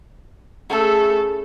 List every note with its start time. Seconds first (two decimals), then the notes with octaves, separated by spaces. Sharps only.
0.69 A3 C#4 E4 G#4 A4